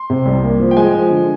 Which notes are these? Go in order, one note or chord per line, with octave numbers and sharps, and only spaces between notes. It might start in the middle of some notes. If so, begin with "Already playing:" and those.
Already playing: C6
C3
C2
A#3
F3
G5
G#3 G#5
F3
D3